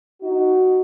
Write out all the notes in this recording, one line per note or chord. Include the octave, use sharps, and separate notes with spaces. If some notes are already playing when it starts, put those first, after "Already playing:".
D#4 F#4